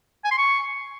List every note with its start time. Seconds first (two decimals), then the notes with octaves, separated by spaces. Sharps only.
0.24 G#5
0.31 C6
0.38 C#6